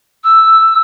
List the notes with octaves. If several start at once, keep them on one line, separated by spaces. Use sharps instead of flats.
E6